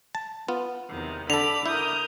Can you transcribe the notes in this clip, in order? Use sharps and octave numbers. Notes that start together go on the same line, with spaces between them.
A5
B3 F4
E2 C3 D#3
D3 A4 B5 D6 F7
E4 A#4 D#6 G6